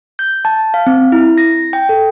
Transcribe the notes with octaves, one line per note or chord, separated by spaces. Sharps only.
G6
A5
F5
C4
E4
A#6
G5
A4